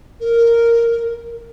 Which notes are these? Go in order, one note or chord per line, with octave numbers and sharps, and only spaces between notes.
A#4